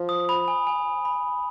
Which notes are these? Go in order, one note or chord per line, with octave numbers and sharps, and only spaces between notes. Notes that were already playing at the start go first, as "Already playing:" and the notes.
Already playing: F3
D#6
B5
G#5
G#5
B5